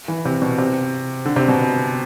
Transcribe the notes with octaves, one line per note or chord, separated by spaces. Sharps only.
E3
C3
B2
C3
D3
C3
B2